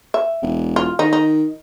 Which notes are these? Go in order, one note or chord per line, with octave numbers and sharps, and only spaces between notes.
E5
E1
F4
D#3 D#4
D#4